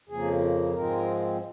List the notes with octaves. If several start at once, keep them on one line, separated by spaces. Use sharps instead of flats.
F2 C#3 F3 A#3 G#4
G#2 F3 G#3 C4 A#4